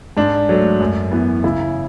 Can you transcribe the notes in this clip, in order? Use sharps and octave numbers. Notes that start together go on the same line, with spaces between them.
G#2 D4
F#3 A3
F#2
E3 B3
C#3 E4